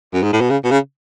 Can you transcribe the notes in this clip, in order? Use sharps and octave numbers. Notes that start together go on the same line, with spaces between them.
F#2
G#2
A2
B2
C#3
B2
C#3